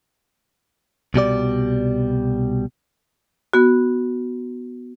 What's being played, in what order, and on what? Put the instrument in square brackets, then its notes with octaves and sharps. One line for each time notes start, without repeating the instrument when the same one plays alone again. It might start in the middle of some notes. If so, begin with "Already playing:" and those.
[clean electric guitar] C2 B2 G3 D5
[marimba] B3 F#4